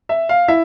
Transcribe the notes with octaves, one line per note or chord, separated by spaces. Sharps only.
E5
F5
E4 E5